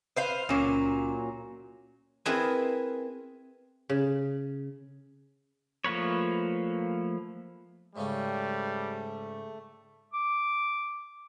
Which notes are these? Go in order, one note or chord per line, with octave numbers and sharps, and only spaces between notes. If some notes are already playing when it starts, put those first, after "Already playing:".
B4 C5 F5
C#2 A#2 F#3 C#4 D6
C4 E4 G#4 A#4 B4
C#3
F3 A3 A#3 B4 C#5
G#2 C#3 G3 A3 C#4
D6